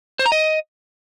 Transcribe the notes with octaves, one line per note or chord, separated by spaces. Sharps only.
C5
A#5
D#5